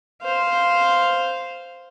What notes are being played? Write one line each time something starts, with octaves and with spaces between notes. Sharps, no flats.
C5 F5